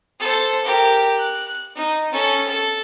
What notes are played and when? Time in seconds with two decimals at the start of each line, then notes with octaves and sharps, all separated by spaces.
0.20 A4 C5
0.65 G4 A#4
1.19 F#6
1.76 D#4
2.12 C#4 A4
2.47 A4